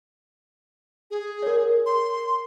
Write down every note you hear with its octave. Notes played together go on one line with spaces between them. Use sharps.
G#4
A#4 C#5
C6